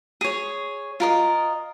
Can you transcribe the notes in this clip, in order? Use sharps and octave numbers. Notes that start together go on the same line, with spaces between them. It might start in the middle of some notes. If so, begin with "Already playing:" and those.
G#4 C#5
F4 A#4 D#5